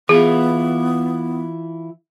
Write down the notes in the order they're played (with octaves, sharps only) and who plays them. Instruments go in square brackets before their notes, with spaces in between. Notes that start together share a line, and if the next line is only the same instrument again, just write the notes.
[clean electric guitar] E3 E4 F4 [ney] B3 [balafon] G#4